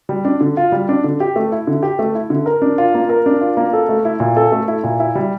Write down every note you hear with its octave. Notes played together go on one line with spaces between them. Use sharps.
G3
D4
D3
F4
G3
D4
D3
G4
A3
E4
D3
G4
A3
E4
D3
A#4
D4
F4
A#3
A#4
D4
F4
A#3
A4
A3
E4
A#2
A4
A3
E4
A#2
E4
G3